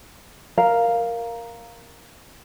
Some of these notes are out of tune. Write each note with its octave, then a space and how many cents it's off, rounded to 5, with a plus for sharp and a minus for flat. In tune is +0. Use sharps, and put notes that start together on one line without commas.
A#4 +0 F5 +0